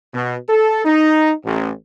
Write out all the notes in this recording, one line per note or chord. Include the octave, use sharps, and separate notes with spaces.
B2
A4
D#4
A1